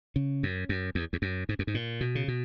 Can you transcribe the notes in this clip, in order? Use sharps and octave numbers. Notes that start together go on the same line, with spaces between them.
C#3
F#2
F#2
E2
E2
F#2
G#2
F#2
G#2
A#2
B2
C#3
B2